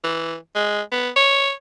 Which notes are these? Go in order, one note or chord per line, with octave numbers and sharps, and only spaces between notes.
E3
G#3
B3
C#5